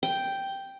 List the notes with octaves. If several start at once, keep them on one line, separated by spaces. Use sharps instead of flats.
G5